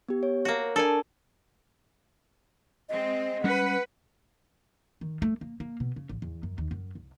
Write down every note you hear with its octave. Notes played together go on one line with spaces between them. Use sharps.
B3 G4
C#5
A#3 F#4
D4 A4 A#4 D5 G#5
G#3 C4 D#5
G3 C#4 B4 F#5
D#3
A3
A#3
A#3
B2
C#3
A1
E2
F#2
D#2
F#2
C2